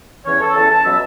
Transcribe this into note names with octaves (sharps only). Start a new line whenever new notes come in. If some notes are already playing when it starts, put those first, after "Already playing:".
E2 E3 C#4 C#5
A4
E2 E3 C#4 A5
A5
B2 F#3 C#4 E5